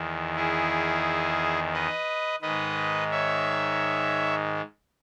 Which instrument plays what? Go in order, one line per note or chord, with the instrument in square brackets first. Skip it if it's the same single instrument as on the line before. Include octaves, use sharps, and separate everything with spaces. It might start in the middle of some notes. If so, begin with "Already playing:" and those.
Already playing: [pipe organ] E2 D#3
E4 G#4
B4 D#5
G#2 D#3 B4 D#5
C#5 E5